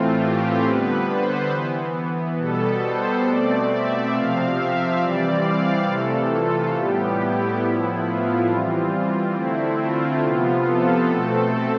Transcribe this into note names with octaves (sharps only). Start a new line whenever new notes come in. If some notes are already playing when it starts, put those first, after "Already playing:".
Already playing: A2 E3 A3 C4 F4
G4
D3 G3 B3 B4
C5
E3 B3
B2 G3 B3 A4
C5
B2 A3 C4 D5
E5
C3 F3 C4 F5
E5
E3 G3 C4 D5
F5
C3 E3 A3 A4
F4
A2 G3 B3 G4
E4
A2 F3 B3 E4
F4
E3 G3 C4 F4
D3 A3 C4 E4
F4
C3 F3 B3 F4
A4
B2 A3 C4 A4